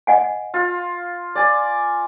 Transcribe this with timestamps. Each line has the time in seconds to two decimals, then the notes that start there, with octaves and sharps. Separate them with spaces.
0.07 D#5 F#5 G#5
0.54 F4
1.35 D5 G#5